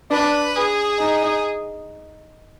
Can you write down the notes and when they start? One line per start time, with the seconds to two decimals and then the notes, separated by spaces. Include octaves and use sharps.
0.11 D4 B4
0.55 G#4
0.99 D#4